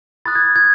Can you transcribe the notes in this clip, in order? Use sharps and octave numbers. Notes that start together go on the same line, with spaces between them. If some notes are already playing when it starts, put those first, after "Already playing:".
B5 D#6 F#6 A6
G#6
G#6